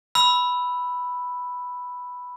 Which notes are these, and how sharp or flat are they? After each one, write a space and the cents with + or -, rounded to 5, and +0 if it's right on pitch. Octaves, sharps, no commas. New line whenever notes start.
B5 +0 E6 +0